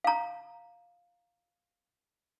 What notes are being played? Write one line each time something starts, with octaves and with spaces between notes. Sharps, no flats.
F5 A#5